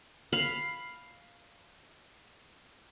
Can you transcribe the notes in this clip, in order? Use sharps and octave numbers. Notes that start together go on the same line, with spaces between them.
F5 B5